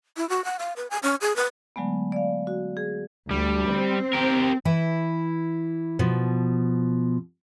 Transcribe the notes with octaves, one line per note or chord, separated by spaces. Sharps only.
E4
F#4
F#5
F5
B4
G#5
C#4
G#4
B4
D3 F#3 G#3 A3 B3
D5 F5
F#4
G#4
D2 G3
C4
G4 A#4
E3 E4
B2 F3